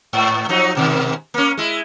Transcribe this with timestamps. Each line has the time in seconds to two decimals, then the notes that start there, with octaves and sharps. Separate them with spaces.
0.13 G#2
0.49 F3 F#3 D#4
0.75 G#2 B2 D#3
1.34 A#3 C#4
1.57 G#3 E4